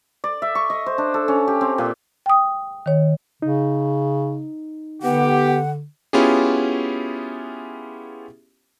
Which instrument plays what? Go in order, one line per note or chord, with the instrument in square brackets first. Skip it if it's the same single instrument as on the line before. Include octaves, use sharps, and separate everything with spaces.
[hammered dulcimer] D5
E5
C#6
D#5
C5
D4
A4
C#4
G4
C4
A#2
[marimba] G5 D#6
D#3 C#5
[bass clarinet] C#3 [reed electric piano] D#4
[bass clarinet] D3 [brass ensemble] B3 G4 [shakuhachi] F#5
[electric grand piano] B3 C#4 E4 F4 G4 G#4